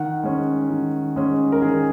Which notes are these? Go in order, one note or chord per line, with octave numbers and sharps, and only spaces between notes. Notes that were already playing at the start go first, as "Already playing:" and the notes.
Already playing: D#3 F#5
G#3 C#4
D#3
G#3 C#4
A#4
D#3 G#4